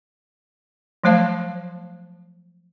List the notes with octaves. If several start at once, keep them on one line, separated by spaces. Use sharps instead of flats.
F3 F#3 A3 C5 F5 A5